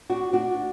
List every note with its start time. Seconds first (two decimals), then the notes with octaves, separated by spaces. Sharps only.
0.10 D4 F#4
0.33 D4 F#4